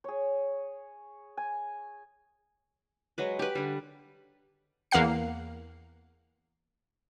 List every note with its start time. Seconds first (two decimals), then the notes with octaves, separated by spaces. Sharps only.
0.04 G#4 C#5
1.37 G#5
3.18 F#3 G#3 B4
3.39 G4 B4
3.55 D3 G3
4.91 E2 A#3 F5 F#5 C7